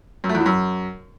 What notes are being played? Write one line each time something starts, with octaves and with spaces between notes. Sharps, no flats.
F#2
A3
E2
E3
F#2